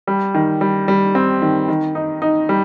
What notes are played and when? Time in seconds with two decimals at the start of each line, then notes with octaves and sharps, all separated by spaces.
0.07 G3
0.35 D#3
0.61 G3
0.88 G3
1.15 C4
1.42 D#3
1.68 D#3
1.95 D#4
2.22 D#4
2.49 G3